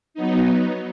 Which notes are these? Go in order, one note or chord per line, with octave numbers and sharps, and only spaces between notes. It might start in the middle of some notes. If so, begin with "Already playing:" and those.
F#3 B3 D#4